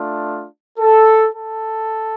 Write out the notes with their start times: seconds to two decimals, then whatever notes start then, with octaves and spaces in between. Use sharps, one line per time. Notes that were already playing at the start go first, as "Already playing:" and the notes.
Already playing: A3 D4 F4
0.79 A4
1.33 A4